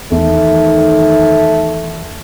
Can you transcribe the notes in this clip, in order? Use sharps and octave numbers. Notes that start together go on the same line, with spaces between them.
E2 D#3 A3